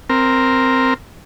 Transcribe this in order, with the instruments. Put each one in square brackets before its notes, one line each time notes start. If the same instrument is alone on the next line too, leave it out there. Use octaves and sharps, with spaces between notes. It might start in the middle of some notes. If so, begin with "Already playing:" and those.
[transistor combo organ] C4 A#4